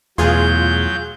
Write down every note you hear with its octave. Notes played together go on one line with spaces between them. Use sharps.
E2 B2 F#3 A3 F4 G#4 G6